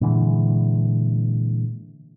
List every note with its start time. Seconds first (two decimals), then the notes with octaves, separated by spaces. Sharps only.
0.01 A#2 D3 E3 G#3